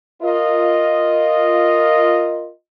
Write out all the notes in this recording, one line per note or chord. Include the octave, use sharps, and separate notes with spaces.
F4 A#4 D#5